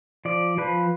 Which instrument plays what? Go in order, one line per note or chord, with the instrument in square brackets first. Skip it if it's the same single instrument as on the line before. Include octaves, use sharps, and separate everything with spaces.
[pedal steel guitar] F3 D5
F3 B4